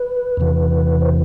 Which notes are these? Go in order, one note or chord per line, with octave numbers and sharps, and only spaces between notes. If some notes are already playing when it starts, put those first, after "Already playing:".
Already playing: B4
E2 C3 E3
C5